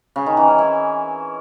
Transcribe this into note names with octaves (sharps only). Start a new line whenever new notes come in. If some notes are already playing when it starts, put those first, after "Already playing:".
C#3
D#3
E3
C#4
E4